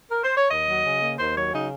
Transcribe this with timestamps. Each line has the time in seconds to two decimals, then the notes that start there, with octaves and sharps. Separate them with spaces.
0.11 A#4
0.24 C5
0.37 C#5
0.50 D#2 D#5
0.67 F#3
0.85 C#3
1.01 A#3
1.19 D#2 C5
1.36 F#3 C#5
1.53 C#3 D#4